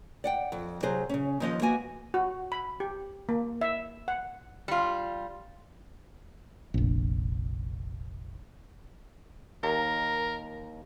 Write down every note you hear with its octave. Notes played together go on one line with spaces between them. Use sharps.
D5 F#5 G5
F2
C3 F#3 G#4 C5
C#3 C#4
D#2 F3 D#5
A#3 B3 F#4 G#5
F#4
B5
G4
A#3
E5
F#5
G3 F4
F1 A#1
D#2 A#4